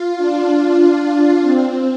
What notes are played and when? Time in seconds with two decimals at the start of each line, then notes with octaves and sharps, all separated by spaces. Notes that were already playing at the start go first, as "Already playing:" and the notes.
Already playing: F4
0.17 D4
1.42 C4